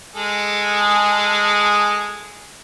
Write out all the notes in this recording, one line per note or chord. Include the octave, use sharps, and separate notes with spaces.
G#3 G#4 A4